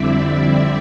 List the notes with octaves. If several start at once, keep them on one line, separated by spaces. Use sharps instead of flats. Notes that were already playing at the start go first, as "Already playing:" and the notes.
Already playing: F2 D3 G3 C4 E4 D5 E5
D5